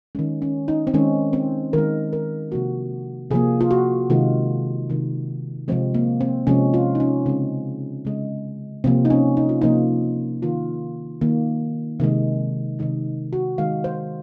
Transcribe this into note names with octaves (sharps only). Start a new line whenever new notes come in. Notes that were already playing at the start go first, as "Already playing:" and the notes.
D#3 G#3 C#4
C#4
D#4
C4
D#3 G#3 C#4
C4
D#3 G#3 A#4
A#4
C3 F3 A#3 F#4
C3 F3 A#3 G#4
F4
F#4
C3 D#3 G#3 F4
C3 D#3 G#3
C3 F3 G#3 C4
A#3
C4
C3 F3 G#3 C#4
F4
D#4
C#4
C#3 G#3 C4
C#3 G#3
C3 F3 A#3 C4
D#4
C#4
D#4
F4
C3 F3 A#3 D#4
D#3 A#3 F4
D#3 A#3
C3 D#3 G#3
C3 D#3 G#3 D#4
F#4
D#3 G#3 F5
C5